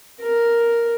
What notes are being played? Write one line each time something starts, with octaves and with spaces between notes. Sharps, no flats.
A#4